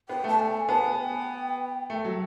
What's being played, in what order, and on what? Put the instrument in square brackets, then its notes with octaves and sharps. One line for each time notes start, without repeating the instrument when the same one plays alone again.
[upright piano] B3 [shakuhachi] G5
[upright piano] A3 [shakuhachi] A5
[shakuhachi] G#5
[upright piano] B3 [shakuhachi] A5
[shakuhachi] G#5
G5
[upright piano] A3
F#3